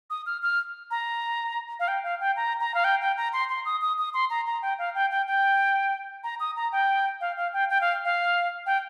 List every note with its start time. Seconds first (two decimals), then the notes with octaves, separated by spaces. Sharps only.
0.10 D#6
0.26 F6
0.43 F6
0.91 A#5
1.80 F5
1.88 G5
2.04 F5
2.20 G5
2.36 A#5
2.60 A#5
2.74 F5
2.84 G5
3.01 G5
3.17 A#5
3.33 C6
3.49 C6
3.65 D#6
3.82 D#6
3.98 D#6
4.14 C6
4.30 A#5
4.47 A#5
4.62 G5
4.79 F5
4.95 G5
5.11 G5
5.27 G5
6.24 A#5
6.40 D#6
6.56 A#5
6.72 G5
7.21 F5
7.37 F5
7.53 G5
7.70 G5
7.81 F5
8.05 F5
8.66 G5